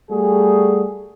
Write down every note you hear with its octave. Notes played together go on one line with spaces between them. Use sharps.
G3 A3 F#4 G#4